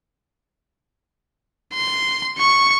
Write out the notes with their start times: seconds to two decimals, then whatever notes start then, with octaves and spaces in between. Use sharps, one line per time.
1.74 C6
2.38 C#6